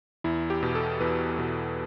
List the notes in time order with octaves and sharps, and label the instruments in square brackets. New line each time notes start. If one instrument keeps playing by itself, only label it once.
[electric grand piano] E2 E4
G4
B2
A4
E2 B4
B2